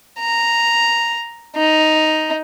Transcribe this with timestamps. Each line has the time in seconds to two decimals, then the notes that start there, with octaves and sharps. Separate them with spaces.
0.19 A#5
1.56 D#4